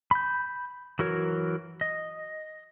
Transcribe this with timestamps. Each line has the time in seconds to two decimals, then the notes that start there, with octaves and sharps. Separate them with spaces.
0.11 B5 G6
0.99 E3 F#3 F#4 A#4 C#5
1.81 D#5